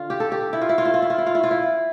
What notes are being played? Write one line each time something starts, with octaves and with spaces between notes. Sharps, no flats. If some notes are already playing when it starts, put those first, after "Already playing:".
Already playing: D3 F4
G4
A4
G4
E4
F4
E4
F4
E4
F4
E4
F4
E4
F4
E4
F4
E4